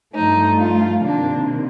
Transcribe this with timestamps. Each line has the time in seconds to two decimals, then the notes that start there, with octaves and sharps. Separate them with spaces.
0.14 G2 F3 A3 D#4
0.58 F4
1.01 C3 D#3 A#3 D4